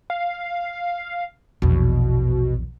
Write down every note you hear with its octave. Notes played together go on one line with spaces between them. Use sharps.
F5
A#1 E2 B2